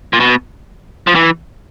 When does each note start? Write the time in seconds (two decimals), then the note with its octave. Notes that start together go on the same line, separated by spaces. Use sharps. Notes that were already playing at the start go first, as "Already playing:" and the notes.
0.13 A#2
0.20 B2
1.07 F3
1.15 E3